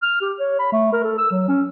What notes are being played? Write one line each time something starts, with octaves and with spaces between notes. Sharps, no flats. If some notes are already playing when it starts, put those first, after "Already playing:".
F6
G4
C#5
B5
A3
A#4
A4
E6
F#3
C#4